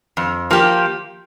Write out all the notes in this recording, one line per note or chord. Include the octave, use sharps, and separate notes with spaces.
F2
F3 A#3 G4